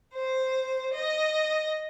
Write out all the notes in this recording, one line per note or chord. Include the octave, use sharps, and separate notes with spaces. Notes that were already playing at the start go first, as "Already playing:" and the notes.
C5
D#5